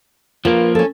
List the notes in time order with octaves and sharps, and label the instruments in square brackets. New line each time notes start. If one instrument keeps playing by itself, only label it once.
[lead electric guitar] F3 A#3 [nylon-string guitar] F4 A#4 B4
[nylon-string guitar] C#4 A4